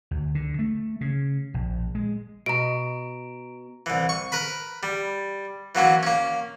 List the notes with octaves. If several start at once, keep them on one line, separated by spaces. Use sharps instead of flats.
D2
D3
A3
C#3
A#1
G#3
B2 A#5 D7
C2 E3
C#6
A#4 B4 B5
G3
E3 F#3 A#3 C#4
A#3 C#4